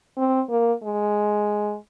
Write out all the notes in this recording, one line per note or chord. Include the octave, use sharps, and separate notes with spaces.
C4
A#3
G#3